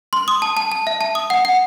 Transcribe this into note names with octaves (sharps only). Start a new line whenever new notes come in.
C6
D#6
A5
A5
A5
E5
A5
D#6
F#5
F#5